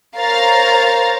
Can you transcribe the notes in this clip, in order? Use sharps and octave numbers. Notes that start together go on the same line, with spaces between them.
A#4 C5 C#5 F5 A#5 A6